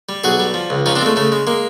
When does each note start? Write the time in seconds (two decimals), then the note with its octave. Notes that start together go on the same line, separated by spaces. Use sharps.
0.09 G3
0.24 B1 F#4 G#4
0.39 G3
0.54 F3
0.70 C#2
0.86 F3 C#4 D#4
0.96 C4 D4
1.02 G#3 A3
1.16 C#3 A3
1.32 G#3
1.47 G#3 A#3